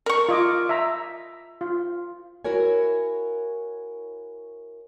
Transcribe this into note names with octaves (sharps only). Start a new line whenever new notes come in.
A#4 C#6
F4 D#5 D6
E5 A#5
F4
E4 F#4 A#4 C#5 G#5